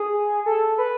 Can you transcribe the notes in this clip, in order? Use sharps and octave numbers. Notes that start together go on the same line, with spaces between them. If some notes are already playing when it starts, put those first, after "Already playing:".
Already playing: G#4
A4
B4